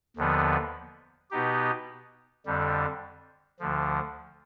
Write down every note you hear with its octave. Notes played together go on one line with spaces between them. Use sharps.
D#2 D3 F3 B3
B2 B3 D#4 G4
F2 D3 G3
D2 D3 F3